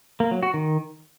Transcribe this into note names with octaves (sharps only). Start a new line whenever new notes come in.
A#3
F#3
F#4
D#3